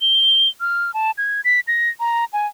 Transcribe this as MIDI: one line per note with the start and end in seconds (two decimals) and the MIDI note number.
0.01 0.49 103
0.61 0.94 89
0.94 1.11 81
1.18 1.41 92
1.45 1.60 95
1.67 1.89 94
2.00 2.25 82
2.33 2.47 80